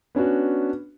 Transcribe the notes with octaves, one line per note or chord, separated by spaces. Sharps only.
B3 C#4 D4 F#4